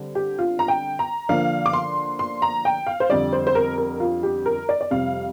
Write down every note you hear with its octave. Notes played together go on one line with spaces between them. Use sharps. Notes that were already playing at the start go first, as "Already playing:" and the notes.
Already playing: D3 G3 C4
G4
F4
A#5
G5
A#5
D3 F3 A#3 D4 F5
D6
C6
C6
A#5
G5
F5
C5
F2 D3 G3 D5
C5
C5
A#4
A#4
F4
G4
A#4
D5
D5
F2 C3 G3 F5